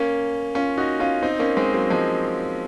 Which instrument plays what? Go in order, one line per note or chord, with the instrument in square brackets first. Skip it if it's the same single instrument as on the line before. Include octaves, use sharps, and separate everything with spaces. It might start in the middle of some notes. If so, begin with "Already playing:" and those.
Already playing: [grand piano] A#3 C#4
C#4 F4
D#4 F#4
C#4 F4
C4 D#4
A#3 C#4
G#3 C4
F#3 A#3
F3 G#3